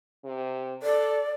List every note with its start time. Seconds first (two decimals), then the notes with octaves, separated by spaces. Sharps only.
0.25 C3
0.83 A4 D5